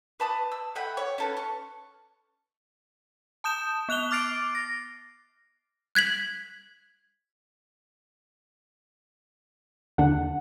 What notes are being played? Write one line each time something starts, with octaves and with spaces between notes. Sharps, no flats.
B4 A5 D#6
E6
A3 F#5 G5 B5
C#5
C#4 A4 B4
C#6
A5 D#6 G6 E7
B3 F#6 F7 G7
D6 F6 A6 C7 D7
A#6
F#6 G#6 B6 F#7
D#2 D3 D4 F#5